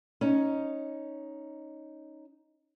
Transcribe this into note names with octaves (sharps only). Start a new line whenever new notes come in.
C#4 D#4